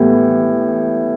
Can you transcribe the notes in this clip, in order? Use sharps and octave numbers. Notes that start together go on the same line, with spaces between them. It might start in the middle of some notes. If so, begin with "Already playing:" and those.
Already playing: A2 E3 G3 B3